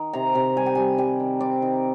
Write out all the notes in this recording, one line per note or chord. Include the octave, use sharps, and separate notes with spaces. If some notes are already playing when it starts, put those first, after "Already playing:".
Already playing: D#3
C3 A#5
C3 A#5
G3 G#5
G5
G3 G#5
G3 G5
D#3
C4 D5
D#3